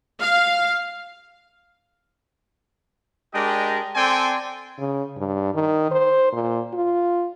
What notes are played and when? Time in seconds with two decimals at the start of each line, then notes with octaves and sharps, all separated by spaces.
0.21 F5
3.34 G#3 D4 G4 A#4 D#5 G5
3.95 C4 A4 D5 G5 G#5 C6
4.79 C#3
5.17 G2
5.54 D#3
5.91 C5
6.33 A#2
6.73 F4